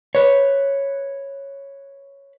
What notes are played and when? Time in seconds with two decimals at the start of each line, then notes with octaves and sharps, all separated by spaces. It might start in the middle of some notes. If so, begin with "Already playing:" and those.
0.15 B4 C#5